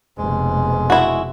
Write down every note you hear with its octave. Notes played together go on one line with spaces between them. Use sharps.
F1 B2 G#3
E4 F#4